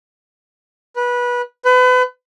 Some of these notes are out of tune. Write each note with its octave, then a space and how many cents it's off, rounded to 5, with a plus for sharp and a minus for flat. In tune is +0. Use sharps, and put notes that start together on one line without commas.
B4 -20
B4 +35